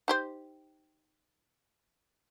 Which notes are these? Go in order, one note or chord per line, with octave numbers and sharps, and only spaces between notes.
D#4 G4 C5